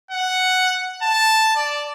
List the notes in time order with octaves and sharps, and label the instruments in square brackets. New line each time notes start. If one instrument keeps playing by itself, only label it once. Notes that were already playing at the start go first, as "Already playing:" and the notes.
[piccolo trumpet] F#5
A5
D5